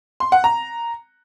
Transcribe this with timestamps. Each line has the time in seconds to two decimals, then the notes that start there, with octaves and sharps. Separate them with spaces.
0.20 C6
0.32 F#5
0.44 A#5